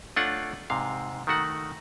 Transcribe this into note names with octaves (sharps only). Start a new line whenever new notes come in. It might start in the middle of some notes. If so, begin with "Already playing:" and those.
A3 D4 F4 C#5 F#5
G#2 C3 F5
D#3 A3 F#4 F#5